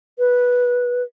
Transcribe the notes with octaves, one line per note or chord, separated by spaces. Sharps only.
B4